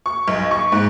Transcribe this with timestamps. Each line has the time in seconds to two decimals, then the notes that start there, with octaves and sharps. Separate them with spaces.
0.06 C#6
0.28 B1
0.51 C#6
0.72 G#2